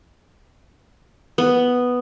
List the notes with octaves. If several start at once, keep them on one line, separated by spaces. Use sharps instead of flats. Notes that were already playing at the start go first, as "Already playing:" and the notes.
B3